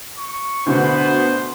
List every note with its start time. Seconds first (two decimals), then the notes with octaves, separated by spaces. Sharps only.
0.18 C#6
0.66 D2 B2 D3 B3 C5